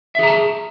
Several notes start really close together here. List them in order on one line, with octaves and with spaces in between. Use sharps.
E5 G#4 A#5 A5